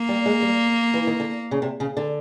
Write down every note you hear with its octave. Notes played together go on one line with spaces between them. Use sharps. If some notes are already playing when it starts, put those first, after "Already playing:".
Already playing: A#3
G3
G#3
G3
E3
D#3
D3
C#3
C3
C#3
D3